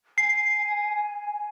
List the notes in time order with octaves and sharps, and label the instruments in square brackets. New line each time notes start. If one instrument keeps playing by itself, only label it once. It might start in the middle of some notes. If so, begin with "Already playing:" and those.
[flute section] G#5 [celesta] C7